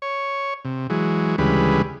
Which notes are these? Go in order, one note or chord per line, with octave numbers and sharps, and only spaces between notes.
C#5
C3
E3 F#3 G#3
D2 C#3 E3 G3 G#3 B4